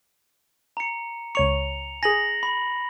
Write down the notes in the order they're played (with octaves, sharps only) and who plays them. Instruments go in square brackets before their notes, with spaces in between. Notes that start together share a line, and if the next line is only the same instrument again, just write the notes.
[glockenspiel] A#5 C#7
[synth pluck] C#2 C#5 C#6 [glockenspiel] C#7 F7
[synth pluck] G#4 G#5 [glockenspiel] A#6 F#7
[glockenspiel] B5